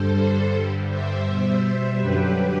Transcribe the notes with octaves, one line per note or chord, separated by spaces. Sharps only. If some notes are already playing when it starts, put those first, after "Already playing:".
Already playing: G2 D3 G3 A4 C5
G2 D3 G3
C5 E5
B2 G3
F#2 D3 F#3 G4 B4